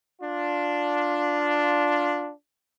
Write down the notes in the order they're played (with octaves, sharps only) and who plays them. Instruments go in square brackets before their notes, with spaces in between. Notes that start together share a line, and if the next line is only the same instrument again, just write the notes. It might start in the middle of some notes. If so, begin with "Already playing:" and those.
[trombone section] D4 F4